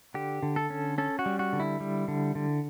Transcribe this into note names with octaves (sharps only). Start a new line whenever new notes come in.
D3 G4
D3
A4
C#4
C#4 A4
F#4
G3
F#4
D3
E4
G3
D3
D3